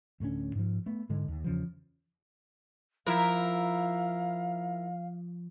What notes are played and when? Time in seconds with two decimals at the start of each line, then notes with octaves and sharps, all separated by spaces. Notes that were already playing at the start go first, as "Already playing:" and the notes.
0.20 D1 A2 D3 C#4
0.55 G#2 F3
0.86 A3 B3
1.09 G#2 D3 G#3
1.28 D#2
1.44 E2 C#3 F3
3.07 F3 E4 A#4 F5